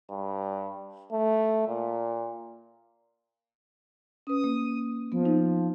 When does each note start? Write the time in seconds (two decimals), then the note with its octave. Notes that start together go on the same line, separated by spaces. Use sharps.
0.10 G2
1.12 A3
1.68 A#2
4.27 C#4 B4 D#6
4.44 A#3
5.12 F3 B3
5.25 D#4